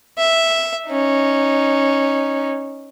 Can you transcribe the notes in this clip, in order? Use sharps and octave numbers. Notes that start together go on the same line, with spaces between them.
E5
C#4 D#4